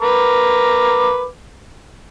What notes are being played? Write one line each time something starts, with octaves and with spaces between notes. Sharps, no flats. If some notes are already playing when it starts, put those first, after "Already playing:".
A#4 B4 D6